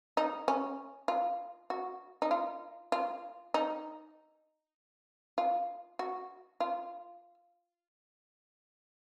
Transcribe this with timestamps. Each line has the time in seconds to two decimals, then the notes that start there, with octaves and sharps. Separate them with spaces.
0.17 D#4
0.48 C#4
1.08 F4
1.70 F#4
2.22 D#4
2.31 F4
2.92 F4
3.54 D#4
5.38 F4
5.99 F#4
6.60 F4